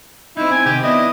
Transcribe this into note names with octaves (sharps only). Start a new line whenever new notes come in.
C4 D#4 E4
C4 G#5
C3 D#3 G4
B3 D4 E4 D#5